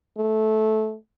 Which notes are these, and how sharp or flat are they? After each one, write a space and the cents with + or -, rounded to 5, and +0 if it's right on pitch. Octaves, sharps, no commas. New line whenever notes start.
A3 -15